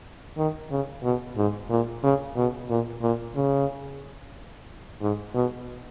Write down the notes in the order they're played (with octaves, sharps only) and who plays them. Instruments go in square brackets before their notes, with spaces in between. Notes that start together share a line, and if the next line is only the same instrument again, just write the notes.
[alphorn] D#3
C#3
B2
G#2
A#2
C#3
B2
A#2
A#2
C#3
G#2
B2